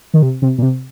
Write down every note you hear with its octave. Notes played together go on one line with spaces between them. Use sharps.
D#3
C3
C3
A#2
C3